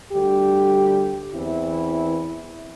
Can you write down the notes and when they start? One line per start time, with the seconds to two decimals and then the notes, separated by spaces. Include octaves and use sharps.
0.12 D2 D3 G3 G4
1.34 E2 E3 C4 E4